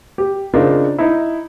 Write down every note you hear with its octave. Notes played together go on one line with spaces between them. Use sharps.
G4
C#3 C4 D4 D#4 F4 A#4
D#4 E4